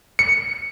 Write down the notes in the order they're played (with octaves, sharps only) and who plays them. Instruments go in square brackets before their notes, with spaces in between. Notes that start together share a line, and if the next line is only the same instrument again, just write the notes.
[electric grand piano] C#7